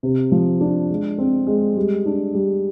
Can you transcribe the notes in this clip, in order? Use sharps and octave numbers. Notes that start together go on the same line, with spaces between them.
C3
F3
D4
G#3
C4
G#3
G3
D4
G3